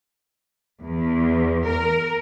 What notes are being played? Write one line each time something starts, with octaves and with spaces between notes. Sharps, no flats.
E2
A#4